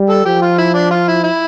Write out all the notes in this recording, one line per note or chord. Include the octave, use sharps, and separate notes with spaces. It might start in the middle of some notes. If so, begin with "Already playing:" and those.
Already playing: G3
A4
F3 G4
F4
E4
D4
F4
E4
E4